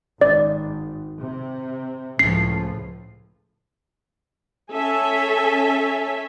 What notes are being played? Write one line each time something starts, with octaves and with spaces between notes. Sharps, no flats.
G#1 D5
C3
C#2 A2 F3 C7
C#4 A4 E5 G#5